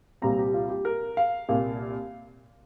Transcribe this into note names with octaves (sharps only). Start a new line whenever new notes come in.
C2 A#2 G3 C4 A#5
G4
F4
G4
A#4
F5
C2 A#2 A#3